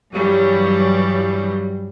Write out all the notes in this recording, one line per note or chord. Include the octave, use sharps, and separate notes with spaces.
G2 E3 F#3 G3